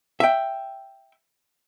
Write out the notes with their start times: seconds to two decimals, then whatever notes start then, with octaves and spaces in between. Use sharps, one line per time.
0.20 E5 G5